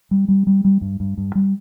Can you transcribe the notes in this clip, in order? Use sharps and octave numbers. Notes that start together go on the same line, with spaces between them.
G3
G3
G3
G3
G2
G2
G2
G3